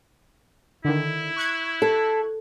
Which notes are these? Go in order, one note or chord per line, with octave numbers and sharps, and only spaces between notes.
D3 D#3 E4
C#6 F#6 G#6
A4